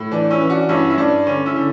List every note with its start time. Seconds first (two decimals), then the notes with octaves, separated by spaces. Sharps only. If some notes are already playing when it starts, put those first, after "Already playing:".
Already playing: A2
0.11 E3 D4
0.31 C#4 E4
0.41 E3
0.50 D4 F#4
0.69 G2 C#4 E4
0.90 E4
0.97 G2 D4
1.26 D3 C#4
1.46 C#4 E4
1.55 D3